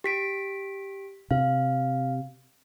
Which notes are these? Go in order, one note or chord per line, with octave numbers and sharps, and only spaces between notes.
G4 B6 D7
C3 F5